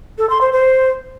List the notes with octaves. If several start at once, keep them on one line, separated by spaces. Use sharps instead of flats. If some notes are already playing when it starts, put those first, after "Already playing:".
A4
C6
C5
C5